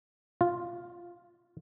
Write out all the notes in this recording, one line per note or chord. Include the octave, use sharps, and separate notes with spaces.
F4